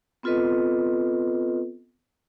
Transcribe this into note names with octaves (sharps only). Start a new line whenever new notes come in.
B3 C4 F4 A4 B4 D#5